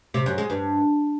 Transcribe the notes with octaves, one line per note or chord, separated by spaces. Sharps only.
C3
F#2
G#3
G2